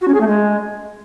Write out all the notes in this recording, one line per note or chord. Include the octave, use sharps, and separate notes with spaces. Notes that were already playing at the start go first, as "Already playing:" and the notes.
F#4
C#4
G#4
A3
G#3